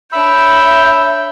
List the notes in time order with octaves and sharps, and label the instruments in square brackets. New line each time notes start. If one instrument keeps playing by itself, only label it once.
[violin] D4 C#5 [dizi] E5 [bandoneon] B5 E6 [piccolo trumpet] G6